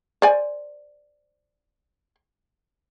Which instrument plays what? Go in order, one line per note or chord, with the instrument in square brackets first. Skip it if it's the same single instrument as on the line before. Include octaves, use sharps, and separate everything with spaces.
[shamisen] C5 D5 G#5